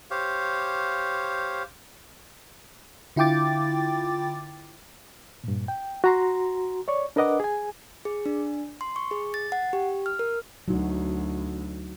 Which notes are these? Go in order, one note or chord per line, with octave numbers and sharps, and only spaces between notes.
G4 C5 C#5 F5
D3 E4 F4 G5 D6 A6
G2 A#2
G5
F#4 A#5 C6
C#5 D5 C#6
D4 A#4 B4 D#5 F#5 D6
G#4 G#5
G#4
D4
C6
C#6
G#4
A6
F#5
G4
F6
A#4
D2 F#3 D#4 F#4